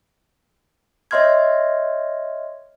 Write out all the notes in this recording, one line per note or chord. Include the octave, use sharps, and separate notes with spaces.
C#5 D#5 E5 C6 F6 G#6